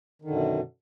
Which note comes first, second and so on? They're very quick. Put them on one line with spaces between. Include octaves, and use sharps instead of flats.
D#3 D3 F#2 B2